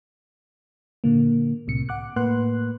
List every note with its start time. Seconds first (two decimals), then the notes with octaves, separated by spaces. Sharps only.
1.04 A#2 D3 A#3
1.67 C2 A2 C3 C#7
1.89 F#5 D6 F#6
2.16 A2 A#3 B4 F#5 C6 F#6